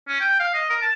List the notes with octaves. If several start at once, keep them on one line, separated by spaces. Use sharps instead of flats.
C#4
G5
F5
D#5
A#4
A5